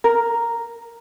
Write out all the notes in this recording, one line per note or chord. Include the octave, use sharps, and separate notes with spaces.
A#4